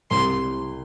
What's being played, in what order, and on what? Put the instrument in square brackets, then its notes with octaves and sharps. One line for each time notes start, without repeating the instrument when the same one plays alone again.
[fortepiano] C2 [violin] C6